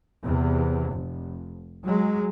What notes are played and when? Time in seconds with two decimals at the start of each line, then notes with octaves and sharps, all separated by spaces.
0.24 E2 C3
0.91 F1
1.84 F#3 G#3